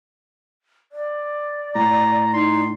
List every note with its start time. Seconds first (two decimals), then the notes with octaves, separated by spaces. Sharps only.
0.92 D5
1.75 A2 A#5
2.33 D#4 C6